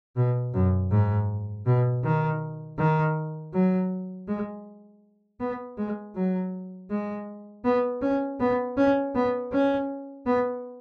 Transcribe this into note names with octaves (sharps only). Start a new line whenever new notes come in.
B2
F#2
G#2
B2
D#3
D#3
F#3
G#3
B3
G#3
F#3
G#3
B3
C#4
B3
C#4
B3
C#4
B3